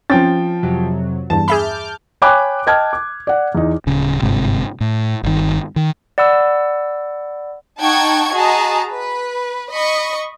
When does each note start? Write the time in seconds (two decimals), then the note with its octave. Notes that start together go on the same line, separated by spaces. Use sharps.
0.10 F3 C4 C#4 G5 A6
0.63 F2 C3 F#3
1.30 E2 G2 A5
1.48 G#4 E5 B5 D6 F6 G6
2.22 C#5 G5 G#5 B5 D6 F#6
2.67 D#5 G5 A5 F6 G#6
2.93 D6
3.27 D5 F#5
3.55 E2 D#4
3.86 D1 C#3
4.22 G1 G#2 C3
4.81 A2
5.23 G1 D#3
5.76 D#3
6.18 D5 F#5 B5 E6
7.81 D#4 F#5 G5 A5 C#6 G#6
8.34 F#4 G#4 D#5 A5 A#5
8.90 B4
9.71 D#5 B5 C#6